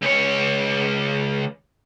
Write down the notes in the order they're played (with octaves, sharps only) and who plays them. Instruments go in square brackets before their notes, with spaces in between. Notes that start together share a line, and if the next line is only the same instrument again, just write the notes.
[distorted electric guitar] C#2 C#5